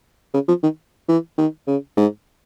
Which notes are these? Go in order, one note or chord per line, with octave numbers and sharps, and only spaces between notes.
C#3
F3
D#3
E3
D#3
C#3
G#2